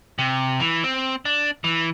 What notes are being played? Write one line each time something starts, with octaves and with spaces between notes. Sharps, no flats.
C3
E3
C4
D4
E3